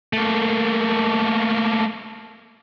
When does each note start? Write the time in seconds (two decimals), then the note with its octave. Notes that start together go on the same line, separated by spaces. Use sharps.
0.13 A3 A#3